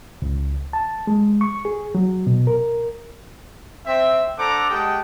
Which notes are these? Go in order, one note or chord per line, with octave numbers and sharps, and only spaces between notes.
C#2
A5
G#3
C#6
G#4
F#3
B2
A#4
C4 E5
D4 A4 C5 F#5 A#5 D6
G#3 G4 F#5 G5 A5 D#6